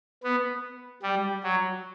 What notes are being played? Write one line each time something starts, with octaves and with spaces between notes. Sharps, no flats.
B3
G3
F#3